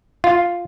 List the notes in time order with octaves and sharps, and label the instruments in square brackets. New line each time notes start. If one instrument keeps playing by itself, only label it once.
[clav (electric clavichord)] F4